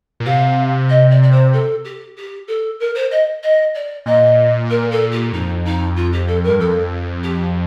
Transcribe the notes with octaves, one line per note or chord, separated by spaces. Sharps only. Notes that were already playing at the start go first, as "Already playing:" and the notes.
A#2
C3 F5
D#5
D5
D5
C5
A4
G4
G4
A4
A#4
C5
D#5
D#5
D5
A#2 D#5
A#4
A4
G4
F2 D#4
D#4
F4
G4
A4
G2 A#4
F2 A4
G4